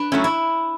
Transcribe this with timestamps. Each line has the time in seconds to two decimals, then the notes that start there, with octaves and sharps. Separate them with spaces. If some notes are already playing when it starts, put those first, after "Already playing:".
Already playing: D4 B4
0.12 F#3 A3 C#4 E4
0.24 E4